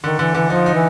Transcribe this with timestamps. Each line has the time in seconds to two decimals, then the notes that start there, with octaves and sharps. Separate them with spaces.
0.04 D3 D#3
0.19 D3 E3
0.35 D3 E3
0.50 F3 D#4
0.66 D#4
0.74 E3